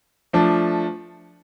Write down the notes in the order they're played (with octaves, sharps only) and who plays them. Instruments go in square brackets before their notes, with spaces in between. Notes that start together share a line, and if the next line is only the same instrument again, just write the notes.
[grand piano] F3 A3 D4